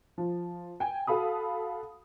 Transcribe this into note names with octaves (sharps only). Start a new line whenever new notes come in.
F3
G5 G#5
F#4 A4 F5 B5 D#6